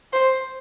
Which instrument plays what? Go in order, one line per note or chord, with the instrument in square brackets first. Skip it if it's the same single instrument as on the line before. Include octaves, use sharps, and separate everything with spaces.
[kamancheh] C5